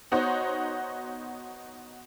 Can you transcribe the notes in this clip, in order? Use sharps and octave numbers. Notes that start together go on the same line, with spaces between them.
B3 D#4 F#4 C5 C#5